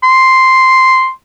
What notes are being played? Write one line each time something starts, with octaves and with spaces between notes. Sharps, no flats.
C6